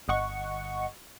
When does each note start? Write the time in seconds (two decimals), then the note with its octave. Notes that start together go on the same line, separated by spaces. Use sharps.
0.08 G1 D#5 F#5 C#6